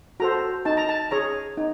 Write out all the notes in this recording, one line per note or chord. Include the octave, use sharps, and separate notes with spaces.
F#4 A4 C5 A#5
D#4 A5
A#5
A5
G#4 C#5 A#5
D#4